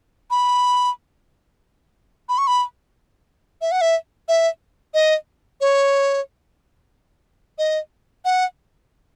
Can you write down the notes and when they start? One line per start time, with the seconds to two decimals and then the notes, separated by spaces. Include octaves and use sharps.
0.30 B5
2.29 B5
2.38 C#6
2.47 B5
3.61 E5
3.72 F#5
3.81 E5
4.28 E5
4.94 D#5
5.61 C#5
7.58 D#5
8.25 F#5